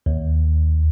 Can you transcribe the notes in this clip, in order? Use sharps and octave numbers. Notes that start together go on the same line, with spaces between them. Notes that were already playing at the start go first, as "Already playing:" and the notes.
D#2